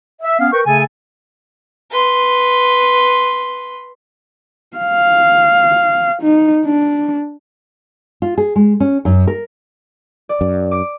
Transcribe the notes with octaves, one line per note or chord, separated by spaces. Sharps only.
E5
B3 C#4 F5
A#4 B4 G5 C#6
C#3 A3 A4 G#5
B4 C6
F5
D#4
D4
F4
G#4
G#3
C#4
F#2
A#4
D5
F#2
D6 D7